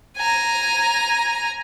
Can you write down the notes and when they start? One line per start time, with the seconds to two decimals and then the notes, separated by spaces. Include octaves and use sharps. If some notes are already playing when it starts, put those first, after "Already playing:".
0.17 G#5 A#5